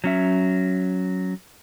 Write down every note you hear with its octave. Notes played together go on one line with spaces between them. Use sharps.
F#3 C#4 E5